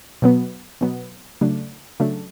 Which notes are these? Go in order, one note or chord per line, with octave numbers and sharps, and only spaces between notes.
B2 F#3 B3
B2 F#3 B3
C#3 F#3 A3 D4
C#3 F#3 A3 D4